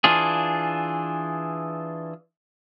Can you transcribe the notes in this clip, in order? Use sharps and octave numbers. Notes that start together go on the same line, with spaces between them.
E3 D4 F4 G#4